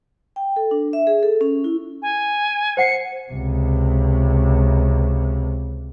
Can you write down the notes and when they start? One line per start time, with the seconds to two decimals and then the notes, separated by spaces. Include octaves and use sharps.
0.36 G5
0.56 A4
0.71 D4
0.93 E5
1.07 G#4
1.23 A4
1.41 C#4
1.64 E4
2.02 G#5
2.77 C5 F#5 C7 C#7
3.32 C#2 C3